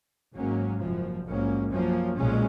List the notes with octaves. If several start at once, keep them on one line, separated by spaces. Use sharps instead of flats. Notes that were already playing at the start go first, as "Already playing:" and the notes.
G#1 G#2 F#3 A#3 C#4
F#1 F#2 F3
A#1 G#2 F#3 A#3 C#4
F#2 F3 A#3 C#4
B1 A#2 G#3 C#4